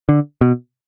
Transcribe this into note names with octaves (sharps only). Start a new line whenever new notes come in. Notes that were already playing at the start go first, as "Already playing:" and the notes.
D3
B2